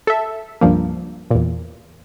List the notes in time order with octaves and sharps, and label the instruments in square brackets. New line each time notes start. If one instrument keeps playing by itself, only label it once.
[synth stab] A4 E5
C#2 G2 F3 A#3
E2 A#2